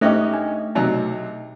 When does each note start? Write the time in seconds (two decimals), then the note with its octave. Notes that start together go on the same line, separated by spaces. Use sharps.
0.01 G#2 A3 C#4 G4 A4 C5 D#5 E5
0.34 D4
0.75 B1 C3 F#3 D#4